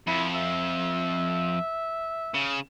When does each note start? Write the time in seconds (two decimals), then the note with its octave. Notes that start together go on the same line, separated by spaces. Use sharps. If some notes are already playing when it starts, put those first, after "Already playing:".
0.07 F2 E4
0.35 E5
2.34 C#3